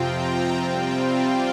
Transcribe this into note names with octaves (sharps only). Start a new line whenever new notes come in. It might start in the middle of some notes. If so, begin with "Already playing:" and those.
Already playing: F2 C3 F3 C4 F4 G5 A#5
C3 G3 C4 F4 G5
F5
D5